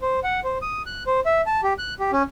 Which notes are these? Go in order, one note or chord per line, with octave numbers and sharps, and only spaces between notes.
C5
F#5
C5
D#6
F#6
C5
E5
A5
G4
F#6
G4
C#4